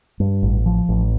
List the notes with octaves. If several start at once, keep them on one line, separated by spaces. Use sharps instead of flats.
G2
A1
F3
A1